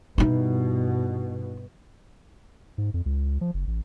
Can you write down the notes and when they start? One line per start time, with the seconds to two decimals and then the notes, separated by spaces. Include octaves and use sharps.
0.18 G2 B2 D#4 E4
2.78 G#2
2.94 F2
3.06 C#2
3.41 F3
3.54 F#1
3.67 A1